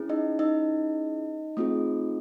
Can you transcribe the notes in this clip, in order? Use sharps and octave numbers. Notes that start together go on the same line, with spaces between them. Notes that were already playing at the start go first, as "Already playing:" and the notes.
Already playing: C#4 E4 G#4
D#4 D#5
D#4 D#5
A3 C4 F4 G#4